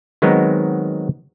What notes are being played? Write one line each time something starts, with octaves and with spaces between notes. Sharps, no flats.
D#3 F#3 G#3 B3 C4 D#4